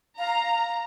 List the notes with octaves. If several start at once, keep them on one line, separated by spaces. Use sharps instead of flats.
F5 A#5